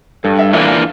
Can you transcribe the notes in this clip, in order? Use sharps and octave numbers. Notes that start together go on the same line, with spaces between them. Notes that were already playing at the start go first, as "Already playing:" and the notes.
G2 A4
E5
E3 A#3 D4 F4 E5
F5